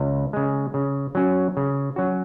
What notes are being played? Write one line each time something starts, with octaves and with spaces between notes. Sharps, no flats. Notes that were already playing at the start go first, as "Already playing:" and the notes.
Already playing: C#2
C#3 G#3
C#3
F#3 C#4 F#4
C#3
F#3 C#4 F#4